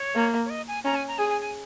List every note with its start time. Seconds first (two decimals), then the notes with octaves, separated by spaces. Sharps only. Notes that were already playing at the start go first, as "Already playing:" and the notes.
Already playing: C#5
0.15 A#3
0.45 C#5
0.50 D#5
0.68 G#5
0.85 C#4 A#5
0.95 G#5
1.08 A#5
1.19 G#4 G#5
1.30 G#5
1.41 G#5